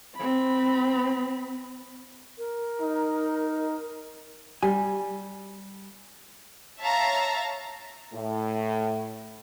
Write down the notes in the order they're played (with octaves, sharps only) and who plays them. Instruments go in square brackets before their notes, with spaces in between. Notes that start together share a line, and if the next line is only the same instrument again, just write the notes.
[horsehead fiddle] C4 B5
[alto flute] A#4
[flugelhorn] D#4
[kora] G3 [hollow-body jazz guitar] G#5
[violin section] C#5 E5 F5 A5 A#5
[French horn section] A2